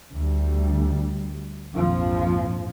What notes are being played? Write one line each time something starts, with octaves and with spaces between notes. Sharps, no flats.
D2 G3
A#1 F2 G#2 F3